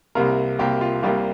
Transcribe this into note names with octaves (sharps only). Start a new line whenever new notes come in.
C2 C3 A#3 A#4
C2 C3 A#3 G4
F4
C2 C3 G3 A#3 G4